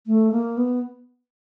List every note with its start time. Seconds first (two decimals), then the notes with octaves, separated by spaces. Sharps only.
0.07 A3
0.32 A#3
0.57 B3